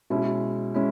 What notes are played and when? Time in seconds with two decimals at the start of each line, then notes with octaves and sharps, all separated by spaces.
0.10 B2 G#3 C#4 E4
0.74 G#3 C#4 E4